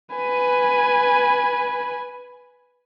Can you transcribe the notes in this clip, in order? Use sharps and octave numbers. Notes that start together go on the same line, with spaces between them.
B4 G#5